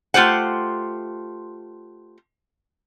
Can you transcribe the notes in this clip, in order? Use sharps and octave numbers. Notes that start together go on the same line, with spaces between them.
A3 F4 G4 C5 F#5